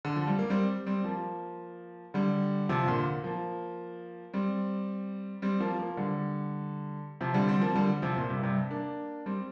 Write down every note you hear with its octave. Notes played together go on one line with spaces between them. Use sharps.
D3
F3
G3
A#3
G3 C4
G3 C4
F3 A#3
D3 G3
C3 F3
A#2 D3
F3 A#3
G3 C4
G3 C4
F3 A#3
F3 A#3
D3 G3
C3 F3
D3 G3
G3 C4
F3 A#3
D3 G3
C3 F3
A#2
G2 C3
G2 C3
A#3 D4
G3 C4